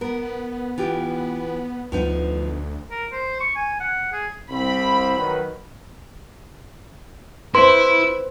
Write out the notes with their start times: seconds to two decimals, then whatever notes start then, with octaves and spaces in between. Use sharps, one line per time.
0.01 B3 A#4
0.78 E3 F4 G4
1.92 D2 F3 B3 D#4
2.91 A#4
3.12 C5
3.40 C#6
3.56 G#5
3.80 F#5
4.12 G#4
4.51 C2 C4 B5
5.17 D#3 F#3 B4
7.55 E4 B4 C5 C6